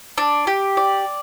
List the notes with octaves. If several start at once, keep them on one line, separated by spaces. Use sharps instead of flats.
D4
G4
D5